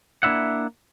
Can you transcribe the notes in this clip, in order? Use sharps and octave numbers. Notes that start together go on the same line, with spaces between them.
A#3 D4 E4 E5 F#5